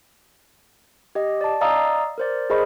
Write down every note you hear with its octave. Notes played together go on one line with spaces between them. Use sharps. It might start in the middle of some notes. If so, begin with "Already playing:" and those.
G4 D#5
D5 A5
D5 D#5 F5 A#5 D#6 E6
A#4 C5 D5
G#4 A#4 C5 D#5 B5 C#6